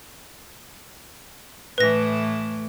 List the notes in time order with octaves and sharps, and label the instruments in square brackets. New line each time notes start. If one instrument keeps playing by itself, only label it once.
[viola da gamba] A2 E3 A3 [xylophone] B4 A#6